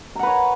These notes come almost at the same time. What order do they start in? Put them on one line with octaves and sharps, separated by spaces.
A#5 F#5 B4 C#5